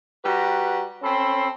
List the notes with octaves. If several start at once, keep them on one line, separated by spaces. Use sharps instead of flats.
G3 F#4 B4 A#5
C4 C#4 A4 B5 C6